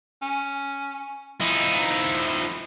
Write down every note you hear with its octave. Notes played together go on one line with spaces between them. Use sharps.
C#4
F3 D#4 E4